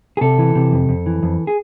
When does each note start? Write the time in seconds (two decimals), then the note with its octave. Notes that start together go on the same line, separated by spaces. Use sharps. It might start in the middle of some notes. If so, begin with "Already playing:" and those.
0.17 G#4
0.21 C3 A4
0.38 E3
0.55 C3
0.72 F2
0.89 F2
1.06 E3
1.23 F2
1.47 G#4